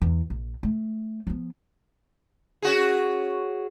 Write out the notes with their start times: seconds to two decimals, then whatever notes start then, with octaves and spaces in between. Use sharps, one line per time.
0.02 E2
0.30 A#1
0.63 A3
1.27 F3 B3
2.62 C#4 F#4 G#4